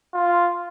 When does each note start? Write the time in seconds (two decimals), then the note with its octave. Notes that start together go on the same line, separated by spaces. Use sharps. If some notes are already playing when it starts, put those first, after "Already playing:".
0.14 F4